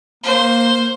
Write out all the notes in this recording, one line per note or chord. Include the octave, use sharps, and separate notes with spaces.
A#3 C5